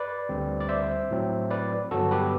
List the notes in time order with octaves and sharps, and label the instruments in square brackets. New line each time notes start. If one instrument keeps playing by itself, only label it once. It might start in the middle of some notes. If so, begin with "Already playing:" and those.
Already playing: [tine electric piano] B4 D5
D2 D3 G3 C4
D5
C5 E5
A2 F#3 C4
B4 D5
G2 D3 F#3 B3 F#4 A4
G4 B4